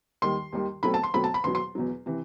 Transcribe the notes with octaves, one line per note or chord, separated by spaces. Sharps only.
D#2 D#3 G3 C6
D#2 D#3 G3
B2 F#3 A3 C4 B5
A5
C6
B2 F#3 A3 C4 B5
A5
B5
E2 B2 F#3 C6
C6
E2 B2 F#3
C3 E3